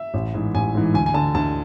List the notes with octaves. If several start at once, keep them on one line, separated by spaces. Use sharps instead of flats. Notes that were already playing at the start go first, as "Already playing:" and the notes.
Already playing: E5
A1
G#2 E3
A1 G#5
G#2 E3
D2 G#5
G#5
D3 A5
D2 A5